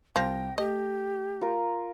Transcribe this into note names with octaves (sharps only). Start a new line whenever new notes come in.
C2 F3 G5 A#6
A3 G4 D#5
F4 A#4